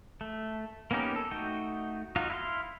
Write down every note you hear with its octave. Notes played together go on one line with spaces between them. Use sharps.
A3
A#3 B3 C#4 D#4 G4
A4
A3 D#4 F#4 G5
D#4 F4 F#4 F5
E4 F5 C6